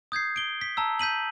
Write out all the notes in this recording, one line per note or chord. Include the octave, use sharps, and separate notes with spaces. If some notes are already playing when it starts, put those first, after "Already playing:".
D#6 G6 G#6 C7
D7 G7
B6
A5 A#5 E6
G6 B6 D#7 F#7